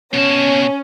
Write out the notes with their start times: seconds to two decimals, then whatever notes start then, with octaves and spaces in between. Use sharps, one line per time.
0.14 B2 C#4 A5